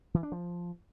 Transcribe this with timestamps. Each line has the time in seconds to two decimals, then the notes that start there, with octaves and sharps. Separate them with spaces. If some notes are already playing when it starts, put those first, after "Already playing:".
0.14 E3
0.23 D4
0.32 F3